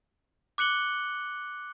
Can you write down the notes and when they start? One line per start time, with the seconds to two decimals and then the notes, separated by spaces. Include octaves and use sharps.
0.58 D6 F#6 C#7 F#7 G7